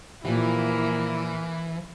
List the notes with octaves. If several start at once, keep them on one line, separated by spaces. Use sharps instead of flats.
A#2 E3 F3 A#3 E4 G4